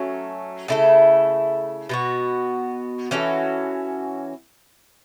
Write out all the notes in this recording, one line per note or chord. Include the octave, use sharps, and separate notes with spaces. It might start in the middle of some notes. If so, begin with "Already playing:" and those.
Already playing: F#3 A3 C#4
C#3 A3 E4 A4
B2 B3 F#4
E3 C#4 F#4 A4